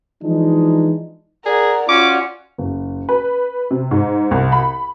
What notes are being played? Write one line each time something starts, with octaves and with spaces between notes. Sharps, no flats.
E3 F3 G#3 D4 D#4
G#4 A#4 D5 F#5
C#4 F4 F#4 D6
F#1
B4
C3
G#2
C2
B5